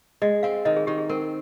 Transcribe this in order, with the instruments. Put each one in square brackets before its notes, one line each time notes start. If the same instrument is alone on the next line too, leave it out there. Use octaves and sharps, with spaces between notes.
[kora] G#3 [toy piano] D#5
[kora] C4 [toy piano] F5
[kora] D#3 [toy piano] D#5
[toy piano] G#4
[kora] D#3 [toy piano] G4
[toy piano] G#4
[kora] C4 [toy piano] A#4